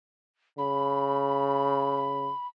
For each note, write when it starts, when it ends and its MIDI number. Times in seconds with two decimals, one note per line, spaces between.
0.58 2.31 49
0.58 2.47 83